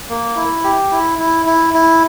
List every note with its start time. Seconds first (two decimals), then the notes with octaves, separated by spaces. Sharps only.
0.09 A#3
0.36 E4
0.64 G4
0.91 E4
1.19 E4
1.46 E4
1.74 E4